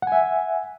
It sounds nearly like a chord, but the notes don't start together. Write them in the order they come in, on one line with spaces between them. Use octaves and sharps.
F#5 G#5 E5